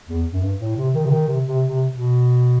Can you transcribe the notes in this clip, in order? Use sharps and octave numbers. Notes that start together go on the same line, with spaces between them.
E2
F#2
G2
A2
C3
D#3
C3
D#3
C3
C3
C3
B2